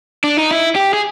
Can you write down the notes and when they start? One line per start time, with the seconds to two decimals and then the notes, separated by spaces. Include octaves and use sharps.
0.24 D4
0.37 D#4
0.51 E4
0.76 G4
0.93 G#4